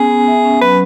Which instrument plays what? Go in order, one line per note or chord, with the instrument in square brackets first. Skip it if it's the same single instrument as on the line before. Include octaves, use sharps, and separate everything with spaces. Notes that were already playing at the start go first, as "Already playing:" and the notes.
Already playing: [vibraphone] B3 C#4 [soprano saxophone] G#4
[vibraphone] B3
E5
C#4
[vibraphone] F#3 [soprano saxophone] B4